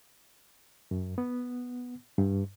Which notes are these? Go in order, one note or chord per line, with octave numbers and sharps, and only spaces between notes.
F#2
B3
G2